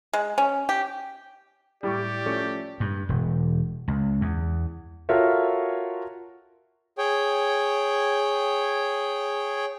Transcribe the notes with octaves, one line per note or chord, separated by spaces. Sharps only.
G#3
C#4
G4
A2 G3 G4 D5 C#6
F3 A3 C#4
G2
E1
C#2
E2
F4 F#4 A4 A#4 C#5 E5
G#4 C#5 G5